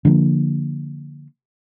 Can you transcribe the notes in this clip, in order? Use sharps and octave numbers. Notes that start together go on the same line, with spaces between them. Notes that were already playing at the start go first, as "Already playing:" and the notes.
D3 F3 G#3 A#3